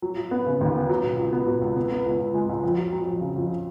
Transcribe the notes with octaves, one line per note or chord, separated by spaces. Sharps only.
F#3
F#3
B3
C#3
D#2
B3
F#3
B2
C#2
B3
B2
C#2
B3
B3
C#2
C#2
G#3
C#2
F2
F#3
F#3
F2
C#3
F2